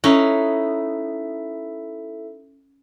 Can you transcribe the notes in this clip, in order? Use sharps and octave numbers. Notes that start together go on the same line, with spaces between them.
C#4 D#4 E4 A4 E5